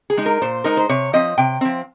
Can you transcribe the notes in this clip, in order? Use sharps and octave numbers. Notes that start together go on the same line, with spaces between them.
G#4
G#3 D#4
A#4
A#2 C5
G#3 D#4 A#4
C5
C3 C#5
F3 C4 D#5
C3 G5
F3 C4